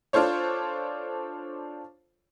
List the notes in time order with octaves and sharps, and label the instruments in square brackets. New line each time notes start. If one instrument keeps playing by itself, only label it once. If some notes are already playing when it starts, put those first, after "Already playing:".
[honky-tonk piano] D4 F4 A4 C5 C#5